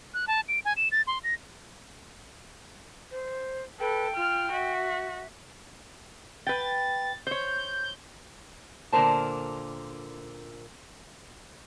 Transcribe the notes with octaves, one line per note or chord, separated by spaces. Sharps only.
F#6
A5
D7
G#5
E7
A6
C6
A#6
C5
A4 B4 G5
F4 F6
F#4 E5
B4 G5 A6
C5 C#5 G6
A#2 D3 A#4 C5 A5